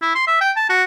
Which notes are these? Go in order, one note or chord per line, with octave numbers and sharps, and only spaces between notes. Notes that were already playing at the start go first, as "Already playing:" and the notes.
E4
C6
E5
G5
A5
F#4